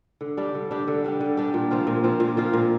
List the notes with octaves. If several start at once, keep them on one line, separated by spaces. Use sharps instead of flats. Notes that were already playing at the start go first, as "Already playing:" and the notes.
D3
G3 D4 G4
D3
G3 D4 G4
D3
G3 D4 G4
D3
G3 D4 G4
A#2
F3 C4 F4
A#2
F3 C4 F4
A#2
F3 C4 F4
A#2